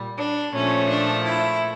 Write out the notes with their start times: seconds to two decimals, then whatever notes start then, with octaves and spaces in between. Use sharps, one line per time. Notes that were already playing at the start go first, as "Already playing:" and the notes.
Already playing: A#2 G3
0.18 D4
0.54 A#2 F3 A3 C#4
0.89 D4
1.25 E4